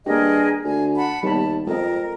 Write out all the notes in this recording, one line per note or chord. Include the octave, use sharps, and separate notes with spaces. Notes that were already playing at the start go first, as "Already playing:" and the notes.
G2 A#3 G4 G#4 A#4 D#5
D2 G#5
F#5 A5 B5
D#2 G3 B3 A5 B5
F2 G#3 C4 A#4 D#5